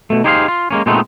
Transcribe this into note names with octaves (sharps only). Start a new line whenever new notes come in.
B2 A3
D#4 G4 G#4 C5 D5 F5
F4
G#3 A#3 C#4
A#2 G#3 A3 B3 C4 D#4